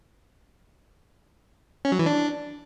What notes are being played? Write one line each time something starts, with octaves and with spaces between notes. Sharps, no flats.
C#4
F#3
E3
D4